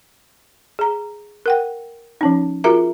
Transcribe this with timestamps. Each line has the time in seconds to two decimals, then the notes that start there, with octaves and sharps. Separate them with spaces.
0.79 G#4 A#5
1.46 A#4 F#5 G5
2.21 F3 C#4 D#4
2.64 F4 F#4 G#4 A#4 E5 A#5